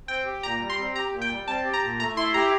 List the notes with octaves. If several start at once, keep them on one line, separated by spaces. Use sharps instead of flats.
C4 G5
G4
A#2 A#5
G3
C6
C4
G4 A#5
A#2
G5
G3
C4 A5
G4
A#5
A#2
A3 A#5
E4 C6
G4 A#5